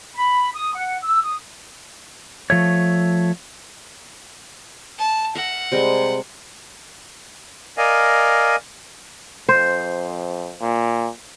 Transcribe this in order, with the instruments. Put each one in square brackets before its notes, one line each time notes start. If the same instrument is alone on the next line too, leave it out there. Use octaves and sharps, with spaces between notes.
[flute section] B5
D#6
F#5
E6
D#6
[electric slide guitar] F3 A3 C#5
[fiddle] A5
[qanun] A#4 E5 [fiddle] F#5
[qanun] C3 G3 G#3
[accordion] A#4 D5 D#5 F5 G#5
[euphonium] F2 [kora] C5
[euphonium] A#2